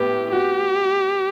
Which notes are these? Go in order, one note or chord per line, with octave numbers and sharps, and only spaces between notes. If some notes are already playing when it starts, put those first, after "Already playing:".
Already playing: A2 B3 G4
F#4 G4